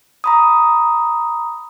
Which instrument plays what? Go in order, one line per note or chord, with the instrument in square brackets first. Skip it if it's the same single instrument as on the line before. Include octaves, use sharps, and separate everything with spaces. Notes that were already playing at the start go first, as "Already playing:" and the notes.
[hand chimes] A#5 B5 D#6